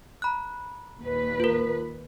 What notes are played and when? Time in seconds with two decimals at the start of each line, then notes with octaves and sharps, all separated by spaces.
0.22 A#5 B5 F#6
1.00 D#2 A#2 B4
1.40 F4 A#4